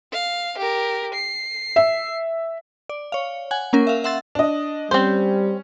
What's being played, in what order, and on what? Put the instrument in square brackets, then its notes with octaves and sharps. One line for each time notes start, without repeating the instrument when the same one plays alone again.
[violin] F5
G4 A#4
C7
[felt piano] E5
[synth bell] D5
C#5 F5
F#5 G#5
A#3 C#4 A#4
E5 F5
E5 F#5 C6 E6 A6
[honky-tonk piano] D4 D#5
[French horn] G3 [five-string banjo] C4 C5 [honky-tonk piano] C#4